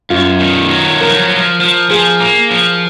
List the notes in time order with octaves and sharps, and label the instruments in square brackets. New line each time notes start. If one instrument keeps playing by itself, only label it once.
[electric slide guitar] F#2 [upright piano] F4
[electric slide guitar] D#3
F#3
[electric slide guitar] F3 [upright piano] A#4
[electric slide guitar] F3
F3
[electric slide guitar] F3 [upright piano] G#4
[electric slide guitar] A#3
F3